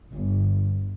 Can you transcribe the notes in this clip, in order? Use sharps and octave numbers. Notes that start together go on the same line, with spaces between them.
G1